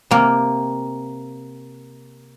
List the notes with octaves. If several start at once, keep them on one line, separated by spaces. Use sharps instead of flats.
C3 A#3